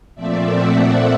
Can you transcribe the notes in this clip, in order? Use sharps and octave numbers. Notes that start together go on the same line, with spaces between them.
A#2 F3 A3 C4 D5 E5
E5 F#5